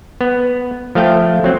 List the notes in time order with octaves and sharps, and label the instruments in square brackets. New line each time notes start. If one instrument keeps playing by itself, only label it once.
[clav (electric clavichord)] B3
F3 A3 F5 G5
F#3 C4